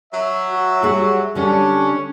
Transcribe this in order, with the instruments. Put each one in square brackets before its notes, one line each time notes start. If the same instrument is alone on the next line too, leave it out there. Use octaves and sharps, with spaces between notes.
[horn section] F#3 E5
[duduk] F#4
[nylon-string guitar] G3 G#4 F#5 [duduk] F#4
[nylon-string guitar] D3 G3 [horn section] C#4 [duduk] D4